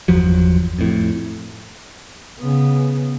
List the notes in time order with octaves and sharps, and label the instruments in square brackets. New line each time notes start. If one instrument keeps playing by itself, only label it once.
[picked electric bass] G1 E2 F3 F#3
F2 A2
[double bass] C#3 B3